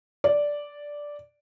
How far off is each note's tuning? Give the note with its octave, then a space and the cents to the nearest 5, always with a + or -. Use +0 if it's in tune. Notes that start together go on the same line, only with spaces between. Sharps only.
D5 -5